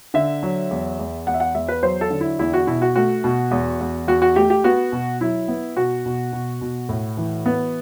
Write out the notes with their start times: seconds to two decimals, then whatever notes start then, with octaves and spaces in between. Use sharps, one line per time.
0.14 D3 E5
0.43 F#3
0.71 E2
0.99 E2
1.27 E2 F#5
1.34 E5
1.40 F#5
1.54 E2 E5
1.69 B4
1.83 F#3 C5
2.01 A4
2.10 D3
2.21 E4
2.39 E2 E4
2.53 F#4
2.67 B2 E4
2.82 F#4
2.95 A3 F#4
3.24 B2
3.51 E2
3.80 E2
4.07 E2 F#4
4.22 F#4
4.36 A3 G4
4.50 G4
4.64 B3 F#4
4.92 B2
5.21 F#3 E4
5.48 B3
5.77 B2 F#4
6.06 B2
6.32 B2
6.61 B2
6.89 A2
7.17 E3
7.46 B3